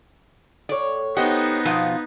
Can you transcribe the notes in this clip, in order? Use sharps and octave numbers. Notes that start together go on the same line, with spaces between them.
A2 C#5 D5
B3 D#4 G4 C5 D#5 F#5
B2 F3 F4